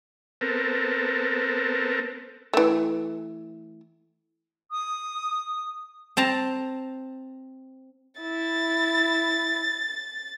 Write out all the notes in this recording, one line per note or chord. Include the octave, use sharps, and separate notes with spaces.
B3 C4 A4 A#4
E3 A3
D#6
C4 A5 A#5
E4 A6